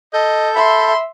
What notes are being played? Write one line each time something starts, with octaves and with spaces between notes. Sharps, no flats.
A4 D#5 G6
E5 B5 C6